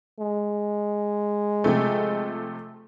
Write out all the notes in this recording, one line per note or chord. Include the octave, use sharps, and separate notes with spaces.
G#3
C3 F3 A3